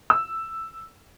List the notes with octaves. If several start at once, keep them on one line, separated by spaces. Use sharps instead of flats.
E6